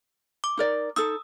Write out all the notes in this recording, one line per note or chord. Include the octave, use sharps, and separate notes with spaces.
D6
D#4 A#4 D5
D#4 A4 D#6 E6